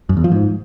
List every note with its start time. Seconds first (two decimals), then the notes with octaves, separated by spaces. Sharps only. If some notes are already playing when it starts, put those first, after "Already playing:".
0.09 F#2
0.17 E2
0.24 F3
0.32 G#2